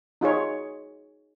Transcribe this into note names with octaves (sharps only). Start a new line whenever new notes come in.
D#4 F4 G#4 C#5